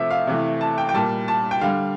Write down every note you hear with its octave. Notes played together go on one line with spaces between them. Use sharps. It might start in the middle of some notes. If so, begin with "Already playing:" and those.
Already playing: C3 F3 A3 E5
F5
C3 E3 A3
A5
G5
G5
A#2 G3 A5
A5
G5
D3 G3 F5